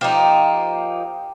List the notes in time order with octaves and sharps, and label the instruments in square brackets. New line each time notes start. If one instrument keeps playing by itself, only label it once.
[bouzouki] F3 A#3 D#4 [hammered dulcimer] G4 F5